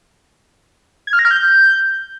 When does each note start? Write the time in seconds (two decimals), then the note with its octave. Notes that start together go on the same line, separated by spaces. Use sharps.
1.07 G#6
1.13 F6
1.19 A#6
1.25 F6
1.31 G6